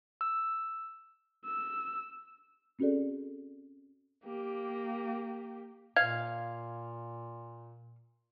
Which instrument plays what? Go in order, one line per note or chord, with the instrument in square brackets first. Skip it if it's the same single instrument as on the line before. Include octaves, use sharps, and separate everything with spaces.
[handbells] E6
[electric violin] E6
[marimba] C4 C#4 F#4 G#4 A4 D5
[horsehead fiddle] A#3 G4
[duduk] A#2 [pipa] F5 [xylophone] G#6